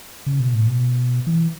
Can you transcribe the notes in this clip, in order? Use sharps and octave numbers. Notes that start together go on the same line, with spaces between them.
C#3
B2
A2
B2
E3